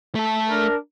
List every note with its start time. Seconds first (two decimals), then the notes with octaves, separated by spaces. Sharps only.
0.15 A3 A4
0.49 D4 A#4